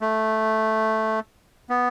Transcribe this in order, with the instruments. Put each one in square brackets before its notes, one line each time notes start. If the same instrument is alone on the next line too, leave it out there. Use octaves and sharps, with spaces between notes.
[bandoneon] A3
B3